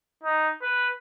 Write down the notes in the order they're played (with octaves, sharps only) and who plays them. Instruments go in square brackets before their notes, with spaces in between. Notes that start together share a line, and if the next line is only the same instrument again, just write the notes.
[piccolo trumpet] D#4
B4